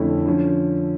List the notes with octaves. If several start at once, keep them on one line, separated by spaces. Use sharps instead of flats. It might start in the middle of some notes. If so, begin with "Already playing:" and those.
Already playing: F2 D3 A3 C#4 E4
D3 F3 C#4